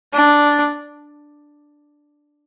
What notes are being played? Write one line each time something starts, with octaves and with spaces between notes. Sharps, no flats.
D4